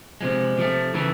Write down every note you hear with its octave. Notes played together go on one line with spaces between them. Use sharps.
C3 F3 G#3
C3 F3 A3
C#3 E3 A3